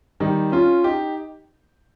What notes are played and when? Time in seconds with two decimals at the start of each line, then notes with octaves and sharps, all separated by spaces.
0.20 D#3 G3
0.52 C#4 F4
0.84 D#4 G4